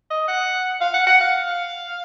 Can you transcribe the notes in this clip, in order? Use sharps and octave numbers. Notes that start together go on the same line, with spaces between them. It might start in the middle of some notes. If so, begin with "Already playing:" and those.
D#5
F#5
F5
F#5
F#5
F5